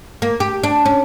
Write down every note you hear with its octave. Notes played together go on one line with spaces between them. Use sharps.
A#3
G4
D4
C#4